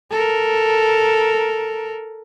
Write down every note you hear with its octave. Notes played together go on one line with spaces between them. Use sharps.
A4 A#4